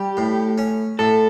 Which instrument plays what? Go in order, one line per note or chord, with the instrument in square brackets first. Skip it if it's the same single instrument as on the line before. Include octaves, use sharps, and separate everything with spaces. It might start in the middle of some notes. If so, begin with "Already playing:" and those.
Already playing: [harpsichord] G3 [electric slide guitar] G4
[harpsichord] A2
C#4
[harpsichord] A2 [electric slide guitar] A4